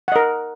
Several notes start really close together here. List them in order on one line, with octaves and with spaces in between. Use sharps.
F#5 D#5 A#4